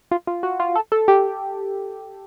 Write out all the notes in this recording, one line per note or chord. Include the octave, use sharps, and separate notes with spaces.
F4
F4
F#4
F4
A4
A4
G4